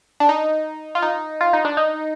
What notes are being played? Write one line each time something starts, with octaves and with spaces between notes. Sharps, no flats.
D4
D#4
F4
D#4
F4
D#4
D4
D#4